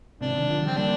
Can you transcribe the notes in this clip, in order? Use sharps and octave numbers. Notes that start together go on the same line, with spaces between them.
G#2 C3 D4
C3 D#3
D3 F3
D#3 G3
C4
G3 A#3 D4